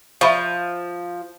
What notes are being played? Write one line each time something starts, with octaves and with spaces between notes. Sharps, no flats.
F3 E5 B5 C#6